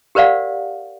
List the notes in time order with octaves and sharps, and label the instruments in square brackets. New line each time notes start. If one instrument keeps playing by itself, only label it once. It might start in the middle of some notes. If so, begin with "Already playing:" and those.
[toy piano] G4 A#4 C5 D5 F5 F#5